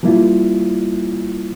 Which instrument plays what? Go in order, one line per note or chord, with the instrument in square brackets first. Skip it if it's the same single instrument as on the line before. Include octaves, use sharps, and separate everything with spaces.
[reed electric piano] F3 G3 A#3 E4 F4